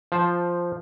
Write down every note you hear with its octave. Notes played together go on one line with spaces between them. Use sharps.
F3 C5 A5